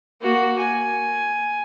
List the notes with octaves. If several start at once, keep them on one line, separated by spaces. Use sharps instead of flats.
A#3 F#4
G#5